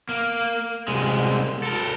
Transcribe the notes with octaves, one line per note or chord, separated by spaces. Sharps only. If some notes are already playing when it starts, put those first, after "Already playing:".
A#3
C2 G#3
A4 A#4